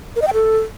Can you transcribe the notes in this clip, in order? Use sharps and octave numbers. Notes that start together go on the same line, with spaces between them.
A#4
D#5
G5
A4